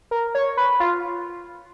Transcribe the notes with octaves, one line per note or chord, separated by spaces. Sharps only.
A#4
C#5
B4
F4